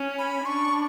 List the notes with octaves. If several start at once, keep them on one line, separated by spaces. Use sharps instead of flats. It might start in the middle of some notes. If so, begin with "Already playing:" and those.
Already playing: C#4
B5
D4 C#6